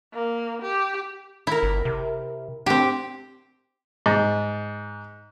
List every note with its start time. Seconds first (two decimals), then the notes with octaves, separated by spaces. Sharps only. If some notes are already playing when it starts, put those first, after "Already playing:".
0.14 A#3
0.62 G4
1.47 E4 A#4
1.63 G1
1.85 C3
2.66 C4 D4 G4
4.06 G#2